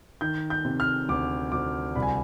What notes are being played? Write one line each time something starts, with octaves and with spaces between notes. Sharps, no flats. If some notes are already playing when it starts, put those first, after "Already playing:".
D#3 G6
G6
C3
F6
D2 D6
D2 D6
C2 B5
G#5